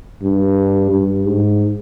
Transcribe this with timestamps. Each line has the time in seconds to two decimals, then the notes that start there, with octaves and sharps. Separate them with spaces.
0.22 G2
0.91 G2
1.26 G#2